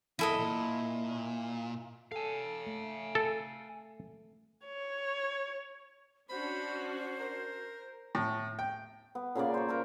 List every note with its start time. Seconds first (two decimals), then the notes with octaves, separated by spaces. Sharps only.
0.19 E2 F#3 E4 A4 D#5
0.38 A#2
2.12 A4 F5 G#5
2.67 A3
3.15 A4
4.65 C#5
6.29 C#4 D4 F#4 C5 B5
7.19 A#4
8.15 A2
8.59 G5
9.15 B3
9.35 A#2 C#3 A#3 D5
9.54 C5 C#5
9.68 A#4 B4 A#5